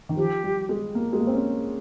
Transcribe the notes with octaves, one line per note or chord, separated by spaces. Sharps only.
D#3
F3 G4
G3
G#3
A#3
G#3
A#3
C4
C#4